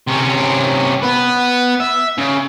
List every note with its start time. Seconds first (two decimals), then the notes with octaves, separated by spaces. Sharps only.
0.07 C3 C#4
1.02 B3 B4
1.80 E5
2.18 C#3